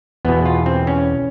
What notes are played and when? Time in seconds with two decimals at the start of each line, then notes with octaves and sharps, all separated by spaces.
0.25 E2 B2 B3
0.45 F4
0.66 C4
0.87 C#4